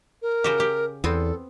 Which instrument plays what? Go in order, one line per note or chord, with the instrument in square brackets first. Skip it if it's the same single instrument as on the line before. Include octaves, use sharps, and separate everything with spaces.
[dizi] A#4
[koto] C#3 F#4 G4
G4
[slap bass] E2 [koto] B3 C4 [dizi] A4